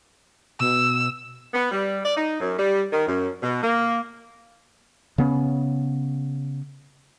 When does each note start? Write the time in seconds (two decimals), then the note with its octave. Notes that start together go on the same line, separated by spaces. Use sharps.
0.60 B2 E6
1.54 B3
1.71 G3
2.05 D5
2.17 D#4
2.40 F#2
2.59 G3
2.92 D#3
3.07 F#2
3.42 B2
3.63 A#3
5.18 C#3 B3 C#4